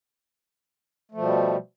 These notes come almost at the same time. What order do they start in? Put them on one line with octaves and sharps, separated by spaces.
A3 F3 B2 G3